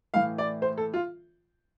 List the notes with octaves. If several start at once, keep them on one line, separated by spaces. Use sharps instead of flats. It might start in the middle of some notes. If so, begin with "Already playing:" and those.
A2 E3 F5
D5
C5
A4
F4